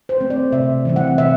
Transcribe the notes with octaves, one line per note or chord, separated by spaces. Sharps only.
C5
A3 C4
D5
C3 E5
E3 G3 C4
F#5
C3 E5